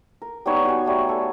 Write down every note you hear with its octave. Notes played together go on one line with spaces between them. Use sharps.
A#4
G3 B3 D#4 C#5
F#4 G#5
F#3 G3 A3 F5
A4 G#5